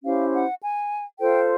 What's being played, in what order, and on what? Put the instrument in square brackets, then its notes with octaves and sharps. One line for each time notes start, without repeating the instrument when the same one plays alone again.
[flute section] C#4 E4 G4 C5 F5
F#5
G#5
F4 A4 C5 G5